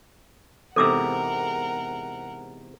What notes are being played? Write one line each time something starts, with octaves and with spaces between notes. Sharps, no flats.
E2 G#2 C3 A4 A#4 F#5 D6 E6